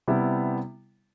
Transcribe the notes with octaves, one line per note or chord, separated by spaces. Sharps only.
C3 G3 B3 E4